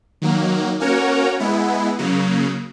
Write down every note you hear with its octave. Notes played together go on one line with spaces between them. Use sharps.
D#3 F#3 A#3
A#3 C#4 F#4 A#4 C#5
G#3 B3 E4
C#3 F#3 A#3